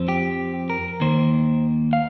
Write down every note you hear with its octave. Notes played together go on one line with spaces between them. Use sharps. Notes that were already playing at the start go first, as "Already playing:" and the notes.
Already playing: F2 F3 C4
G4
A#4
D#2 D#3 A#3 C5
F5